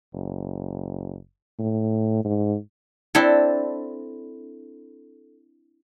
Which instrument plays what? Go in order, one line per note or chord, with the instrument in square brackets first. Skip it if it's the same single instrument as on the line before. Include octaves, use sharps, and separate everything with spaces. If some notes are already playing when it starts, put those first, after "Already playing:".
[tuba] F#1
A2
G#2
[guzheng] C4 D4 E4 A4